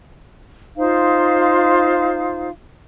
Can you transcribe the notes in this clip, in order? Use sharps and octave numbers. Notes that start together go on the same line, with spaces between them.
D#4 F4 C5 F5